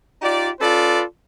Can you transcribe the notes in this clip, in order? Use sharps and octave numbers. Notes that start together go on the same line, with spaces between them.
D#4 F4 G4 D5
C#4 F4 A4 B4 D5